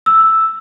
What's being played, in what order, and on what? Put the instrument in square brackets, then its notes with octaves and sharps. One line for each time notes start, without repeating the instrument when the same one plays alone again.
[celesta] E6